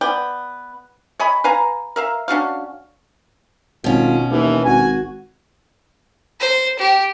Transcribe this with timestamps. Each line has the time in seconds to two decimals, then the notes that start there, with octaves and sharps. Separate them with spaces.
0.01 B3 D5 G5
1.19 C#5 D#5 G#5 B5
1.44 B4 F5 G#5 A#5
1.96 A#4 E5 F5
2.28 C#4 D4 F#4 F5
3.84 G#1 B2 C#4 F4
4.31 D#2 E3
4.66 G#1 F#4 G#5
6.40 C5
6.79 G4